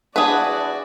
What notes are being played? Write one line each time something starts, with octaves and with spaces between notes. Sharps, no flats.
E2 F3 D4 F#4 G#4 B4 D5 A5